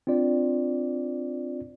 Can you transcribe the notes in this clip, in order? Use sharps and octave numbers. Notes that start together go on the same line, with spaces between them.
C4 D4 F4 D5